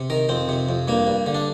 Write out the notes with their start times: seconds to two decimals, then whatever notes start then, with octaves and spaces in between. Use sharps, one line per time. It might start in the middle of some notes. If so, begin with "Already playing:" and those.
Already playing: C3
0.10 D#3 A#4
0.29 F2 C4
0.49 C3
0.69 F2
0.88 G2 A#3
1.07 G2
1.26 D3
1.35 D4